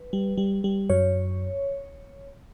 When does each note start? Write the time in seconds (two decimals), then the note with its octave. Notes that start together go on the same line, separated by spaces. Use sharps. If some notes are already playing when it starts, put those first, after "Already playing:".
Already playing: B4
0.13 G3
0.38 G3
0.64 G3
0.90 F#2 C#5